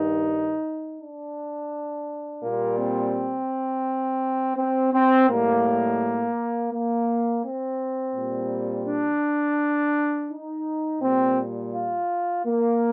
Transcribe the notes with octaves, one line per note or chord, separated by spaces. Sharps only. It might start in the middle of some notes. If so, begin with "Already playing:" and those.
Already playing: G2 D#3 G3 D#4
D4
A#2 G3 A#3
C4
C4
C4
A2 G3 A#3
A#3
C4
A#2 G3
D4
D#4
A#2 G3 C4
F4
A#3